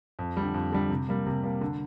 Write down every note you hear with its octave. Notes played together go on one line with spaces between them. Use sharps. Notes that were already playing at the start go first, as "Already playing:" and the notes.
F2
D3 G3
F2
D3 G3
C3
G3 A#3
C3
G3 A#3
D3